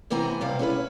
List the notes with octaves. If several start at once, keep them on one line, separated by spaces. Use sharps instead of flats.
C3 E3 B3 C4 G#5 A#5
G2 C3 G3 F5
C#4 E4 G#4 B4